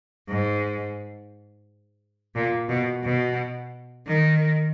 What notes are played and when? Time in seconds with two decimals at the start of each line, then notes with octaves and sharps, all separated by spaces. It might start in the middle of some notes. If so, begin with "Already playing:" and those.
0.28 G#2
2.35 A#2
2.69 B2
3.04 B2
4.06 D#3